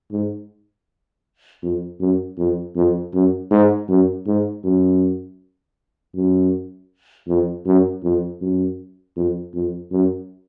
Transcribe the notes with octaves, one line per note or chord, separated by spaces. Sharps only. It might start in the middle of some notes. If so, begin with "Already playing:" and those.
G#2
F2
F#2
F2
F2
F#2
G#2
F#2
G#2
F#2
F#2
F2
F#2
F2
F#2
F2
F2
F#2